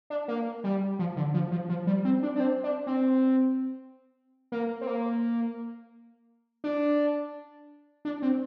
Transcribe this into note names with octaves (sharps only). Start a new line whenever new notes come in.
D4
A#3
G3
F3
D3
F3
F3
F3
G3
C4
D4
D4
C4
D4
C4
A#3
C4
A#3
D4
D4
C4